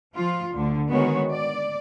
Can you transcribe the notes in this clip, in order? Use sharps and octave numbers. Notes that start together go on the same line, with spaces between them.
F3 F4
D2 D3
D#3 G#3 B3 F#4 C#5
D5